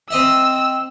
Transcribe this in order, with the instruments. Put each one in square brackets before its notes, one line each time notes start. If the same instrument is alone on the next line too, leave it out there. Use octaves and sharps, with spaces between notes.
[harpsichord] C4 D#5 E5 [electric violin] E6